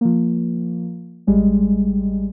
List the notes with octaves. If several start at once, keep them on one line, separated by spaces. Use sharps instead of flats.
F3 A#3
A1 G3 G#3